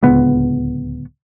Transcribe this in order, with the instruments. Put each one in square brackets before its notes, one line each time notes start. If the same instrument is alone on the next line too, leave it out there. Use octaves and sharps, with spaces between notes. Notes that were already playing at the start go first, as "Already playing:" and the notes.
[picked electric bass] D1 C#2 B3